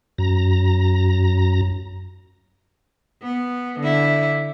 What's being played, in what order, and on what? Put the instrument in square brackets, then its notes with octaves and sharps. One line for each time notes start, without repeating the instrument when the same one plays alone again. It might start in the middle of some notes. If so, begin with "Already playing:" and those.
[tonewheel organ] F#2 A#5
[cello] B3
D3 E4